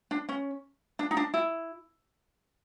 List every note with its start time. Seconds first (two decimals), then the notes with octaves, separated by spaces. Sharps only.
0.11 D4
0.29 C#4
0.99 D4
1.11 D#4
1.17 D4
1.34 E4